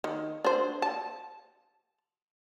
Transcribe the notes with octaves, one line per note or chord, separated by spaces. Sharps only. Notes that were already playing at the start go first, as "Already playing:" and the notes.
D#3
D4 C5
A5